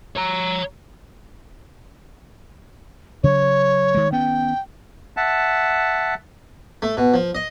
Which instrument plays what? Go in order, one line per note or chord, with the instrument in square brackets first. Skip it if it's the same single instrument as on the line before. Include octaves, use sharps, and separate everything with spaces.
[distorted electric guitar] C#5 A#5
[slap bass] C#3 F#3 [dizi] C#5
[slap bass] D#3 G#3
[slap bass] D#3 B3 C#4 [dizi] G5
[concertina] E5 F#5 A5
[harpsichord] A3
B2
F3
D#5